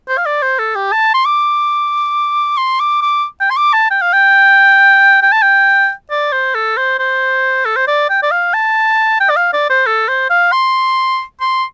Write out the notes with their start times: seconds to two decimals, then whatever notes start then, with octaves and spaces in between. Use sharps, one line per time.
0.09 C5
0.18 F5
0.26 D5
0.42 C5
0.59 A4
0.75 G4
0.92 A5
1.14 C6
1.25 D6
2.58 C6
2.80 D6
3.02 D6
3.40 G5
3.50 C6
3.57 D6
3.73 A5
3.91 G5
4.02 F5
4.13 G5
5.22 G5
5.32 A5
5.42 G5
6.11 D5
6.32 C5
6.55 A4
6.77 C5
6.99 C5
7.65 A4
7.76 C5
7.88 D5
8.10 G5
8.23 D5
8.31 F5
8.54 A5
9.20 G5
9.30 D5
9.36 F5
9.53 D5
9.70 C5
9.87 A4
10.08 C5
10.30 F5
10.52 C6
11.41 C6